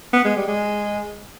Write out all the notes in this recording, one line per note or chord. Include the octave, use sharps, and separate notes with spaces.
B3
G#3
G3
G#3